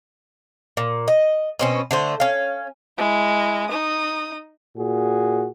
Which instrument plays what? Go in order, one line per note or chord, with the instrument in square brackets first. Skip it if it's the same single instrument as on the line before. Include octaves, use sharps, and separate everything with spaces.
[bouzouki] A#2
D#5
B2 C4 C#4
D3 A3 C5
C#4 F5
[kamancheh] G#3 E4
D#4 D#6
[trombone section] A#2 F#4 G#4